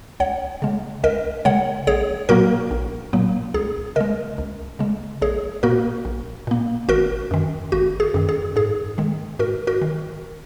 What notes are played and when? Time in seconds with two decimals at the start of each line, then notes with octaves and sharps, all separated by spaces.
0.20 C#2 C#5 F#5
0.62 C#3 G#3
1.03 C#2 A#4 D#5
1.45 C#3 G#3 C#5 F#5
1.87 A#1 G#4 C#5
2.29 A#2 F#3 A#3 F#4 A#4
2.71 A#1
3.13 A#2 F#3 A#3
3.54 C#2 G#4
3.96 C#3 G#3 A#4 D#5
4.38 C#2
4.79 C#3 G#3
5.22 A#1 G#4 C#5
5.63 A#2 A#3 F#4 A#4
6.05 A#1
6.47 A#2 A#3
6.89 G#1 F#4 A#4
7.31 F#2 D#3
7.72 G#1 F#4
8.00 G#4
8.14 F#2 D#3
8.29 G#4
8.56 G#2 G#4
8.98 D#3 G#3
9.39 G#2 F#4 A#4
9.67 F#4 A#4
9.82 D#3